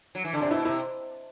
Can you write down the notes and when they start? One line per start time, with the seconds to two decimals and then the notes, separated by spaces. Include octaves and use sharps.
0.15 F#3
0.24 E3
0.33 D3
0.41 C3 D4
0.51 B2 E4
0.65 C3 E4